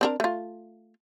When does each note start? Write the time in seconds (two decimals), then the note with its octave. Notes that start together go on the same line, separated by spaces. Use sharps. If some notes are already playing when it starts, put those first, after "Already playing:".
0.01 C4 D4 A#4
0.20 A3 F4